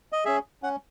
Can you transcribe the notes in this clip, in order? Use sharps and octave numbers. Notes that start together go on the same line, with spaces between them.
D#5
C#4 G#4 E5
C#4 F#5